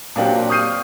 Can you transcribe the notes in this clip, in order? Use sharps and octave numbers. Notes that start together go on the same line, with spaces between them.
A#2 F#3 A#3 C4 D4 G4
C#6 D#6 F6 G6 C7 D#7